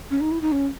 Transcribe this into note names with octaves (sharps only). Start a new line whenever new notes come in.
C#4
D#4
E4
D#4
C#4